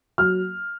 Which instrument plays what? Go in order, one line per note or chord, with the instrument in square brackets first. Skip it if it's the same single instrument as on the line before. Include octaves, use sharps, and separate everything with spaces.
[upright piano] F#3 F6